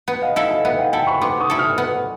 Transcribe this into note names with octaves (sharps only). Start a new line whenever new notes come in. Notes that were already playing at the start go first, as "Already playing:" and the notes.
B3
D#5 F5
E4 A4 D#5 F5
D#5 F5
B3 E5 F#5
F5 G5
E4 A4 G5 A5
B5 C#6
B3 C6 D6
C#6 D#6
E4 A4
D#6 F6
B3